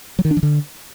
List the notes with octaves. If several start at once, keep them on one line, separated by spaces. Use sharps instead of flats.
F#3
D#3
D4
E3
D3